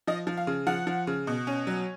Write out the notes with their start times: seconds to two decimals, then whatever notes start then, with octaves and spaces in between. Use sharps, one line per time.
0.07 F3 D#5
0.27 F3
0.37 F5
0.47 C#3
0.67 F3 F#5
0.87 F3
1.07 C#3
1.27 B2
1.47 C#4
1.67 F#3